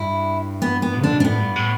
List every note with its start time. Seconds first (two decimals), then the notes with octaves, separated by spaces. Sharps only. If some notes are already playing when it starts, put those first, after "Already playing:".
Already playing: G2 E4
0.62 B3
0.82 B3
1.00 D3 D4
1.13 B2
1.20 D4
1.25 A2 B3
1.40 G2
1.56 A2